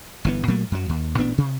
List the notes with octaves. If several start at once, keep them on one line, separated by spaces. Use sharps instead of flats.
G1 E3 B3
A#2 F#3 A3 A#3
F#2 F#3
D#2
A1 A#2 B3 D4
C3